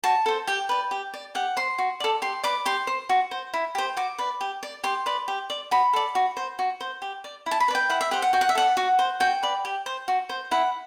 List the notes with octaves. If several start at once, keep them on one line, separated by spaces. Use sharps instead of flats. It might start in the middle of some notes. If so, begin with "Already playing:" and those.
F#4 A5
A4 C5
G4 G5
B4 D5
G4
D5
G4 F#5
C5 C6
F#4
A4 D5
G4 C6
B4 D5 D6
G4 C6
C5
F#4
C5
E4
G4 C5
F#4 D6
B4 D5
G4
D5
G4 C6
B4 D5
G4
D5
F#4 B5
A4 D5
F#4
C5
F#4
C5
G4
D5
E4
A5
B5
B4 D5
G5
E4 F#5
E5
G4 C5 F#5
F#5
F#4 G5
F#5
E5
A4 D5 F#5
F#4
C5
F#4 G5
B4 D5
G4
C5
F#4
C5
E4 F#5